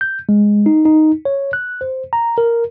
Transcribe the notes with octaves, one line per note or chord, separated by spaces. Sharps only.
G6
G#3
D#4
D#4
C#5
F#6
C5
A#5
A#4